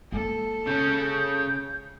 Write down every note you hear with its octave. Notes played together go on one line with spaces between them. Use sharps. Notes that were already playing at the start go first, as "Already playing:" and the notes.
G#3 A#3 A4
C#3 C#4 G6